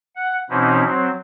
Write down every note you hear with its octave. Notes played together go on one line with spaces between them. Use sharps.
F#5
B2 E3 C4 C#4 D#4 E4
F#3 C4